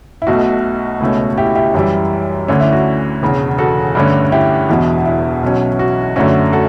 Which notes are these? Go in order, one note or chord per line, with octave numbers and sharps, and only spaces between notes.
E4
B1 B2 A3 F#4
C#2 B2 A3 C#4
E4 G4
E4 G4
F#2 E3 G3 E4
D2 D3 A3 C#4
E4
F#4
E1 E2 C#3
F#4 A4
G2 D3 A3 C#4
E4 G4
E1 E2 B2 E4
E4
B1 B2 F#3 C#4
F#4
F#2 D3 A3 C#4 F#4
F#4 A4